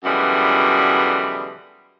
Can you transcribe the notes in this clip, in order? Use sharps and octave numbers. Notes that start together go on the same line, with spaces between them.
F#2 B2 D3 E3 G3 G#3